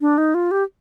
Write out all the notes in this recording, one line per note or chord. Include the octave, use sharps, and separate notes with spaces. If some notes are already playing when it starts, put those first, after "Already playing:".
D4
D#4
F4
G4